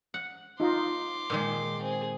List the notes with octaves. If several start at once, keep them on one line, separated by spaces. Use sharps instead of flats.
F#5
D#4 F4 C6 D6
A#2 D#3 G#3
C4 G#4